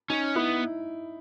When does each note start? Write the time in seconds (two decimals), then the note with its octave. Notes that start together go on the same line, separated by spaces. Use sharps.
0.09 C#4 D#4
0.35 B3 E4